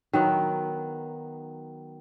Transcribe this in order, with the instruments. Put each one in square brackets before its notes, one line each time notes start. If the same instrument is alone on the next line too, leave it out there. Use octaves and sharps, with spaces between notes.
[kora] D#3 F#3 B3